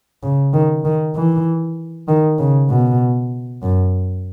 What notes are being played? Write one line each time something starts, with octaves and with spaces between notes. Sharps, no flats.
C#3
D#3
D#3
E3
D#3
C#3
B2
F#2